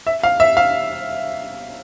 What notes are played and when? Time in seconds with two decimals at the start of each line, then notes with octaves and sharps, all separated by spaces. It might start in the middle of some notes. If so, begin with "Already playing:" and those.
0.07 E5
0.23 F5
0.40 E5
0.57 F5